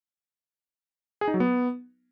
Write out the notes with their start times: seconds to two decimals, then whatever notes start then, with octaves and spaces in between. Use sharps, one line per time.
1.21 G#4
1.28 D#4
1.34 F#3
1.40 B3